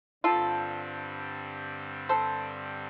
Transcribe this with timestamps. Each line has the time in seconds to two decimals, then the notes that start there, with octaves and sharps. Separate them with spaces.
0.24 G2 D3 G3 C4 F4 A4
2.09 A4 C5